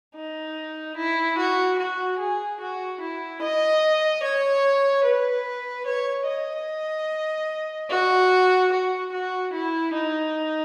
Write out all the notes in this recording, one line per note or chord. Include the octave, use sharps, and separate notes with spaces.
D#4
E4
F#4
F#4
G#4
F#4
E4
D#5
C#5
B4
C#5
D#5
F#4
F#4
F#4
E4
D#4